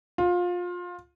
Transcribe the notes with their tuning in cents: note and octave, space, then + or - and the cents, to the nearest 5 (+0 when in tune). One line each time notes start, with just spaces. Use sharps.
F4 +25